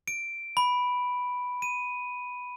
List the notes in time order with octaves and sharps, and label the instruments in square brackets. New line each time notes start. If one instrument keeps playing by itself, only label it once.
[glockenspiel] D7
B5
D#7